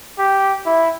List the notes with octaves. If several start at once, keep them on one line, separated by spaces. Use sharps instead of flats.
G4
E4